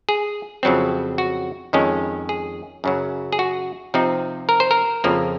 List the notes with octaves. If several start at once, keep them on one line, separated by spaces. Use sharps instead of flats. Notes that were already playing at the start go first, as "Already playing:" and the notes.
G#4
F2 C#3 F#3 C4
F#4
F2 D#3 G#3 C#4
G#4
F#2 C#3 F#3
G#4
F#4
C3 F3 C4 D#4
A#4
C5
A#4
F2 C#3 F3 A#3